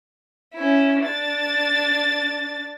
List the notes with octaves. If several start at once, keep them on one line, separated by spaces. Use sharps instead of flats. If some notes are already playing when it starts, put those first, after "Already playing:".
C#4 E4
D4 A6